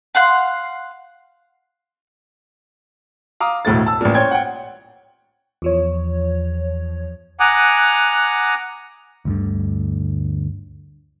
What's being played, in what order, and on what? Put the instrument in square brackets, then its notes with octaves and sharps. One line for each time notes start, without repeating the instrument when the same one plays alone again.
[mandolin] F5 F#5 C6 F#6
[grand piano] F5 A#5 D6 D#6
E1 D2 A2 A3 A6
A5 E6
A1 A#2
C5 C#5 G5 G#6
F#5 G5
[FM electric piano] E2 F3 C#5
[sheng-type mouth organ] F#5 G#5 A#5 D6 D#6 F#6
[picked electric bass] D2 G2 D3